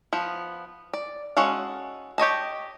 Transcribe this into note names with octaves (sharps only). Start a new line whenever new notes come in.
F3 B3
D5
G#3 C#4 F#4 A4 F5
G4 C#5 D#5 A5